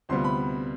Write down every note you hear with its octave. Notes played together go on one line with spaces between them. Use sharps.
D2 C3 G3 B3 F4 C6
B5